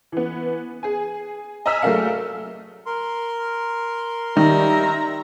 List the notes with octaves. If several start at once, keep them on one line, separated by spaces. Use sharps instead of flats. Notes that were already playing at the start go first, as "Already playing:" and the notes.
E3 B3
G#4 G#5
D#5 G#5 A#5 E6 F6 B6
F#3 A3 G#4 A#4 D5 F5
A#4 C6
D#3 G3 E5 A#5